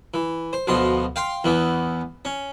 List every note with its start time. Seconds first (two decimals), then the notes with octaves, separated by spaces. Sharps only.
0.14 E3
0.53 C5
0.67 D2 B2 F3 C6
1.16 F5 G5 C6
1.44 E2 E3 B3
2.25 C#4